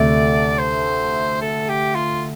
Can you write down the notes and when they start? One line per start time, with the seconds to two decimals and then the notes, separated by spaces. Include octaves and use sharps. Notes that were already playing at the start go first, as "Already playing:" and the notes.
Already playing: D2 C3 A3 D5
0.59 C5
1.41 A4
1.69 G4
1.95 F4